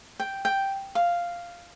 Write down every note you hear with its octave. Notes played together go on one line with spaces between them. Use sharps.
G5
G5
F5